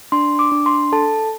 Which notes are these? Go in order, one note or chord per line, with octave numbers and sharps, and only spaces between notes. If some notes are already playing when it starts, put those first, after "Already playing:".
D4 C6
D6
D4
C6
A4 A5